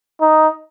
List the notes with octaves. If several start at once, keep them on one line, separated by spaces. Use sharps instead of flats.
D#4